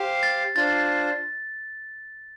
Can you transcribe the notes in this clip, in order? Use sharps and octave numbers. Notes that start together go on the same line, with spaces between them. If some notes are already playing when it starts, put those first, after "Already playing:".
Already playing: G4 C5 F5
A6
D4 F4 C5 A6